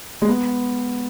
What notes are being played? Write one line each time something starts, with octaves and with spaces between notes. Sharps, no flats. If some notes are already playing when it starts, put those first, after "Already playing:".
G#3
B3